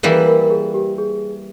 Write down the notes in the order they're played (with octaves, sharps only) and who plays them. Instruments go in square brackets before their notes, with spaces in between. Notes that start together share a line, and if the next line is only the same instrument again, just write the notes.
[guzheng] E3 G3 A#3 E4 [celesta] G#4
[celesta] A#4
A#4
G#4
G4
G#4